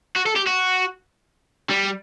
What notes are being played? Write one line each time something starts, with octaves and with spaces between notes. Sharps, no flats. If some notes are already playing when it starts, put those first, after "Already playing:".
F#4
A4
G4
F#4
G3